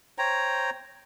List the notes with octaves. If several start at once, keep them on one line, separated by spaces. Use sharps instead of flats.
C5 C#5 G5 A#5